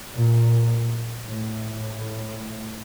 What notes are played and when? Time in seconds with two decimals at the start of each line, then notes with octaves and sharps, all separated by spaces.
0.12 A#2
1.26 A2